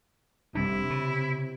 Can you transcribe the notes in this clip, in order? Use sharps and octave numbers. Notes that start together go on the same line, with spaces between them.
F1 C3 G3 D4 E4
C#3